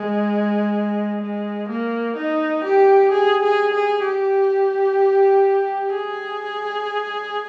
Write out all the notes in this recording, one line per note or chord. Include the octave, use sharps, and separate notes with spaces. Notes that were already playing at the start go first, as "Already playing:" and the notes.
Already playing: G#3
G#3
A#3
D#4
G4
G#4
G#4
G#4
G4
G#4